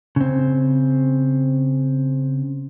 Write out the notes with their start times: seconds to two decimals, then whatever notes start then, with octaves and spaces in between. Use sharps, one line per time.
0.16 C#3 C4